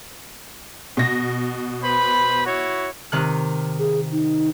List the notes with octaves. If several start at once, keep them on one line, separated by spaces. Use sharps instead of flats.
B2 A#6
B4 C5 B5
E4 F#4 C#5
C3 D#3 F#6
G#4
D#4